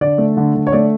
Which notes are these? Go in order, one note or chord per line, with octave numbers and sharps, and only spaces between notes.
D3 D5
A3
D3
D3
C#5
A3 D5